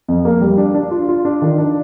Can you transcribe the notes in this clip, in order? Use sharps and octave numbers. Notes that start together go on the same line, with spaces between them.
F2
A#3
G3
D4
D4
F4
F4
D4
D#3
D4